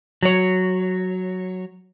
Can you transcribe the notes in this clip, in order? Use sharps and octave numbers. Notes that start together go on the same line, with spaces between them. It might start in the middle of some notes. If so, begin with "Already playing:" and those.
F#3 C#5